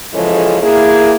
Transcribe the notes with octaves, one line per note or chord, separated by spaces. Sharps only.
C#3 E3 F3 G#3 C#4 A4
A#3 E4 G#4